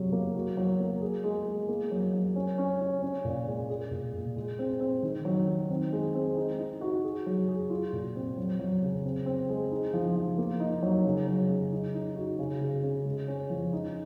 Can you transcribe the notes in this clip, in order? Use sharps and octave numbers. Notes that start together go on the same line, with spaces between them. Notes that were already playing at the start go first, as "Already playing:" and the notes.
Already playing: C3 F#3 G#3
A#3
F#4
F#3
A#3
G#4
G#3
G#3
A#3
F#3
F#3
C#4
C#4
C#4
C#4
A#2
G#3
G#4
A#2
A#2
G#3
C4
C4
D#3
F#3
D#3
C4
G#3
C4
D#4
D#4
F#4
G#4
F#3
G#4
F4
A#2
C4
F#3
F#3
C#3
C4
C4
G#3
D#4
F3
F3
A#3
D#4
F#3
C#3
F#3
C#3
D#4
D#4
F#4
C#3
C#3
C#3
G#3
C#4
F3
D#4